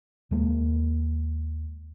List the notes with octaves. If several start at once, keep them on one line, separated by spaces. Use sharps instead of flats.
D#2 G#3 A#3